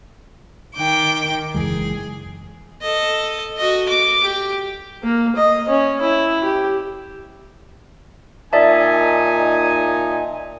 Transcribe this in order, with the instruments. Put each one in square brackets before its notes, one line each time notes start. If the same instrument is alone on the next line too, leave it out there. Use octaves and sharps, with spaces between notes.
[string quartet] D#3 G5 D6
[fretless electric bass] F#1 E3 G#3 [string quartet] G#4
[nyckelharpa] A4 D#5
F#4 D#5
D6
G4
A#3
D#5
C#4
E4
G4
[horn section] A#2 D#4 G#5 [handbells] D5 E5 A5